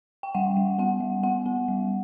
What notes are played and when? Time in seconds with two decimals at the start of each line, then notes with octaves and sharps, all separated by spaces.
0.23 G5
0.35 G3 F#5
0.57 G3
0.78 B3 F#5
1.00 G3
1.23 B3 F#5
1.46 B3
1.68 G3